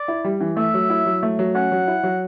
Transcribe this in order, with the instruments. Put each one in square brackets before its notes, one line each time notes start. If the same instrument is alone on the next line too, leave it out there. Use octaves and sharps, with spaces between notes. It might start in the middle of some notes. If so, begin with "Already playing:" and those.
Already playing: [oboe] D5
[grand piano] E4
G3
E3
[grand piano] A3 [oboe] E5
[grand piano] F#3
E4
F#3
A3
F#3
[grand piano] C#4 [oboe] F#5
[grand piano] F#3
E4
F#3